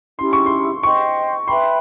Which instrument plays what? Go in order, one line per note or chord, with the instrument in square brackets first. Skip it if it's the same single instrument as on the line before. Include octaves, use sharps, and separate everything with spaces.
[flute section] C#4 E4 G4 [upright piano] C6
[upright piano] C#6
C6
[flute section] C5 D#5 G5 C6 [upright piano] C#6
[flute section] B4 E5 G5 B5 [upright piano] C6